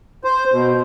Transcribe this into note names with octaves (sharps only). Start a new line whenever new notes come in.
C5
B2